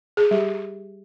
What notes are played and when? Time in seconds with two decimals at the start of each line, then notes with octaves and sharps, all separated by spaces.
0.17 G#4
0.31 G3 G4